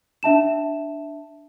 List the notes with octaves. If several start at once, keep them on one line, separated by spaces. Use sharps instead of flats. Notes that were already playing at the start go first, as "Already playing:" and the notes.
D4 E5 A5 E7